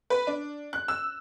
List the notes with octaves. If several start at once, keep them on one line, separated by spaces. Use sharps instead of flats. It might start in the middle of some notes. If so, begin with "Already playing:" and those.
B4
D4
F#6
E6